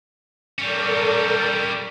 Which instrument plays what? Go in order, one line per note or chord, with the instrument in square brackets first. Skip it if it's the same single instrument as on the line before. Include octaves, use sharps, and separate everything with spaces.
[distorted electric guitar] G3 C#4 [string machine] A4 A#4 D5